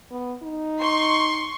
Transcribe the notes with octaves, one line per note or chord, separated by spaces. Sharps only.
B3
D#4
C6 C#6